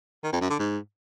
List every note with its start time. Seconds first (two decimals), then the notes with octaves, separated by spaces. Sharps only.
0.23 D#3
0.32 F2
0.41 F#2
0.50 D3
0.59 G#2